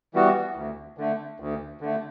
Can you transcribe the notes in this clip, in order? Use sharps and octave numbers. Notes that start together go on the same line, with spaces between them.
E3 G3 B3 F#4
D2
D3 A3
D2
D3 A3